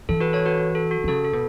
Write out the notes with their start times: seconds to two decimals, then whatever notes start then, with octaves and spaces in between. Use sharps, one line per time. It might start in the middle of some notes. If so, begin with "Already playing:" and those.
0.09 E3 A4
0.20 F#4 B4
0.33 A4 C#5
0.46 F#4 B4
0.58 F#4
0.75 A4
0.91 F#4
1.04 E3
1.08 C#3 A4
1.25 A4
1.33 B2